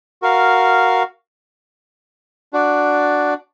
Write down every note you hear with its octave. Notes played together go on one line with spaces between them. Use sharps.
F#4 A#4 F5
D4 F#4 D5